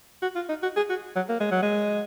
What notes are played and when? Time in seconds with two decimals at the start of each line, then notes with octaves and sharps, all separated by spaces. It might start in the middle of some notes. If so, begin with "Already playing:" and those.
0.22 F#4
0.36 F4
0.49 D#4
0.63 F#4
0.76 G#4
0.90 F#4
1.16 F#3
1.29 A#3
1.40 G#3
1.51 F#3
1.62 G#3